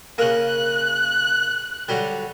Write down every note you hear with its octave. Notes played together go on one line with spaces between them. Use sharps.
C#3 A#3 F#6
D3 F#3 G3